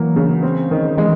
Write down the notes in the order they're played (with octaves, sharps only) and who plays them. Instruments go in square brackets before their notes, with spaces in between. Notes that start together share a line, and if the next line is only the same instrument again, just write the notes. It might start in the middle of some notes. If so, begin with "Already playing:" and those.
Already playing: [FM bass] E3 [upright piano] F#3 A#3
[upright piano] C#3
C4
D#3
[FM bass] E3 [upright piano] G#3